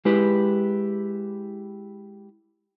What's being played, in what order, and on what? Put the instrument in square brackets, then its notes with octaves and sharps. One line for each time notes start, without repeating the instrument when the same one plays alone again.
[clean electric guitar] G#3 E4 G4 B4